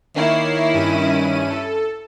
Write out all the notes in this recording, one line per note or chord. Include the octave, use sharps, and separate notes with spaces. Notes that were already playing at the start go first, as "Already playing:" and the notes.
D#3 A#3 E4 C#5 C7
G2 C#4 D#7
A4